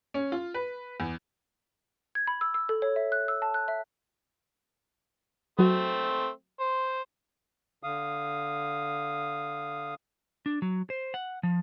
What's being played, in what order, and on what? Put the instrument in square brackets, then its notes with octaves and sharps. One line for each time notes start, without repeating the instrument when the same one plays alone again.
[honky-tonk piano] C#4
F4
B4
E2
[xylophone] G#6
B5
E6
E6
A4
C#5
E5
F#6
E6
A5
F#6
E5
[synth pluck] F#3 F#4 [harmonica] A3 C4
[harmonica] C5
[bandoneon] D3 F5 D#6
[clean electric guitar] D4
F#3
C5
F#5
F3